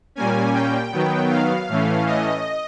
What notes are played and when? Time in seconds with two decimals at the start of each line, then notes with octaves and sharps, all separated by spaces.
0.15 A#2 G3 A#3 C#4 G#5
0.54 G5
0.92 D#3 F#3 B3
1.30 F5
1.68 A2 E3 A3 C#4
2.06 D#5